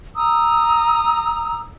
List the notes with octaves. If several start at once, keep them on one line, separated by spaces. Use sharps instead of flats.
A#5 D#6 E6